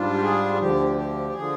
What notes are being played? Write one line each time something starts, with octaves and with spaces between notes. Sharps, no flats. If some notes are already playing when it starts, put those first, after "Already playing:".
Already playing: G#2 G3 D4 F4
G4
G#4
G#4
D2 D3 F3 G4
G4
D3 F3 G#4